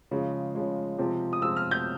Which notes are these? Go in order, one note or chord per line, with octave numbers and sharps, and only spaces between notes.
C#3 F3 G#3
C#3 F3 G#3
C3 F3 G#3 C4
D#6
C3 F3 G#3 C4 E6
F6
G6